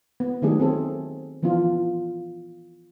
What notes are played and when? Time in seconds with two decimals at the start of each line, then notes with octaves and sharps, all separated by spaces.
0.20 B3
0.42 D#3 F#3 A3 D4 G4 G#4
0.60 C4 G#4 A4 B4
1.43 E3 F3 B3 D4 F4